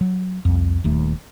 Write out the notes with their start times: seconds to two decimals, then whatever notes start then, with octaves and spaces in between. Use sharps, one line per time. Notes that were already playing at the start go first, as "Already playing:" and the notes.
0.01 F#3
0.45 C2 F2
0.84 D#1 D#2 A3